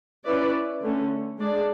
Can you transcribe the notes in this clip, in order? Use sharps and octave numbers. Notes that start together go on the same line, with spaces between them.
C#4 E4 B4 D5
D3 A3 C#4
G#3 D4 G#4 D5